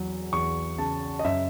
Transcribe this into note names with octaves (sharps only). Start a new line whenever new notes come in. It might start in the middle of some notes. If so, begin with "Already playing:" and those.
Already playing: E2 F#3
E2 C#6
C#3 A5
D#5
F#2 E5